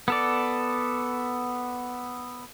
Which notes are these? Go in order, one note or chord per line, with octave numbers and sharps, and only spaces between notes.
B3 A4 D5